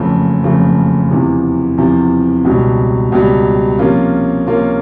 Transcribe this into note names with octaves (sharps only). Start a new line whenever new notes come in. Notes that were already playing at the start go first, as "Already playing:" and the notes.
Already playing: F#1 F2 C#3 F3 A3
F#1 F2 C#3 F3 A3
E2 C3 F3
E2 C3 F3
C#2 B2 G3
C#2 B2 G3
C3 F3 A#3 C#4 F4
C3 F3 A#3 C#4 F4